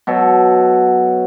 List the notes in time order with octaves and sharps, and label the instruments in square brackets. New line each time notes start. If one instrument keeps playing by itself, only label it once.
[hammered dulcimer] B2 F#3 F#4 A4